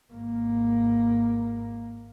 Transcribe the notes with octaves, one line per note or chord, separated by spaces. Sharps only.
G#1 A#3